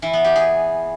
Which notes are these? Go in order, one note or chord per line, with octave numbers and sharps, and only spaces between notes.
E3
B3
G4
G#4